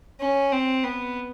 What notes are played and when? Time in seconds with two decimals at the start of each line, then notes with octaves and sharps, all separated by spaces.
0.20 C#4
0.52 C4
0.84 B3